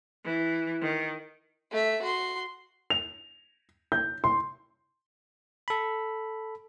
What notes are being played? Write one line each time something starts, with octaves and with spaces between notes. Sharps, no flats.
E3
D#3
A3 E5
F#4 C6
F7
G6
C6
A4 B5